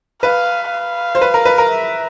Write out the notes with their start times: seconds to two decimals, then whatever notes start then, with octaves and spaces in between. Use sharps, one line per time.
0.23 B4 F5
0.72 F5
1.15 C5
1.21 B4
1.34 A#4
1.45 B4
1.58 A#4
1.71 E5